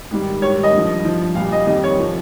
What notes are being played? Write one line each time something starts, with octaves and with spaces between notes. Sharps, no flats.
G#2 D#3 G3
G#2 D#3 G3 C#5
D#5
G2 F3
G2 F3
A#2 G3 F5
D#5
F2 D#3 G3 D#5
C#5
C3 F3